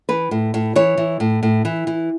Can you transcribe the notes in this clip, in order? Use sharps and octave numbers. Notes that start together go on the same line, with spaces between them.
E3 B4
A2
A2
E3 C#5
E3
A2
A2
E3
E3